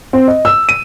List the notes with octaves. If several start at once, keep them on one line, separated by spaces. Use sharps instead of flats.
C4
D#5
E6
D#7